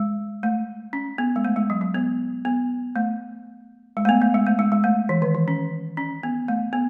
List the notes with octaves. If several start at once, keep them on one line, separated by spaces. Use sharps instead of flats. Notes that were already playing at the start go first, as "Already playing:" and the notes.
Already playing: G#3
A3
C#4
B3
G#3
A3
G#3
F#3
F#3
B3
B3
A3
G#3
A3
B3
A3
G#3
A3
G#3
G#3
A3
E3
D#3
E3
C#4
C#4
B3
A3
B3